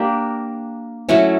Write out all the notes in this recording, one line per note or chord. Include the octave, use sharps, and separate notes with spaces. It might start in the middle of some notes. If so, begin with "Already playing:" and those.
Already playing: A#3 D4 G4 A#4
F#3 A3 C#4 E4